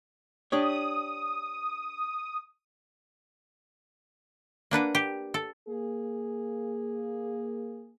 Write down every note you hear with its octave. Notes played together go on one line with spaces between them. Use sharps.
D4 G4 C#5 D#6
A#3 D4 B4 F#5
G4
A4
A#3 G#4